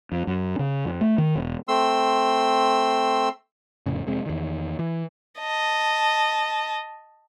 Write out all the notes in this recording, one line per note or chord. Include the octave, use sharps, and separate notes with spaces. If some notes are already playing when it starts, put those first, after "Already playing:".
F2
F#2
C#3
F2
A3
D#3
E1
A3 C4 C6 E6
F1 F2 A2 C#3
F1 C3 G#3 C4
E2 D#3
E3
D#5 A5